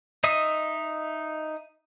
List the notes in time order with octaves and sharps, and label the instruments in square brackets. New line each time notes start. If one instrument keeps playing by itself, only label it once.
[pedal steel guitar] D#4 D#5 E5 D#6